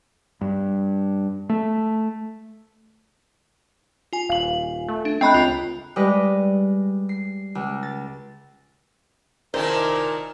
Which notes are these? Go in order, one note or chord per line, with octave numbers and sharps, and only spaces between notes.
G2
A3
F4 G#5
D#1 F5 F#7
A3
D4
A3 C4 D#5 G5 A#5 B5 F#6
C#2 F4
G3 G#3 B4 D#5
C7
C#2
A6
F1 A#2 D#3 E4 A#4 C5 A5